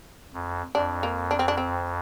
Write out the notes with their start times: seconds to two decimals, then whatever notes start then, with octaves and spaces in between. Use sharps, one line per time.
0.34 F2
0.75 F2 D4
1.03 A#3
1.31 D4
1.39 C4
1.48 D4
1.57 C4